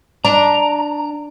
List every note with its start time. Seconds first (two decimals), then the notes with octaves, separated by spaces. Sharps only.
0.25 D4 A#5